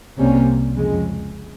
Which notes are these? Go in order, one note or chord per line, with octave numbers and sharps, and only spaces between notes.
C2 C3 G3 A#3 C#4
F2 C#3 G#3